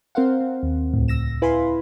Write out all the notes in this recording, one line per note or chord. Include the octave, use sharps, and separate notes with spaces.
C4 A#4 C5 F5 F#5
C4
D#2
C#2 A2
E6 A#6 E7
E4 B4 F5 G#5 B5 C6